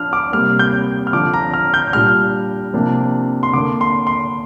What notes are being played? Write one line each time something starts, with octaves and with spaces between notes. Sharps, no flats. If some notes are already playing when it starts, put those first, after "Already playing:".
Already playing: F3 D4 F6
D6
C3 G3 A#3 F6
G6
F6
D3 F3 D4 D6
A#5
F6
G6
A#2 G3 D4 F6
C3 F3 A#3 D4
C6
D3 A#3 D4 D6
C6
C6